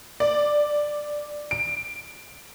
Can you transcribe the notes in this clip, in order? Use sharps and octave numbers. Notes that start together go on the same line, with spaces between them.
D5
D7